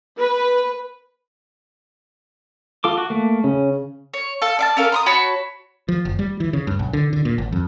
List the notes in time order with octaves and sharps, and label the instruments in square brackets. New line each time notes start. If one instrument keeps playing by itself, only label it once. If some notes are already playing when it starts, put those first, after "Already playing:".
[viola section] B4
[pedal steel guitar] F4 A4 D6
F#4
A3 A#3
[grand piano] C#3 [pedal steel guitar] C#4
[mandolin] C#5
A4 F5
D5 F5 A5
C#4 A4 A#4 F5
A#5 C6 D#6
F#4 C#5 A5 B5
[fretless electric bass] F3
F#1
G3
E3
C#3
G2
B1
D3
D3
A#2
G#1
F2